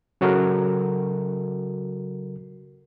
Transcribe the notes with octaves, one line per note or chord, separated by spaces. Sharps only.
C#3 F#3 F#4 A4 A#4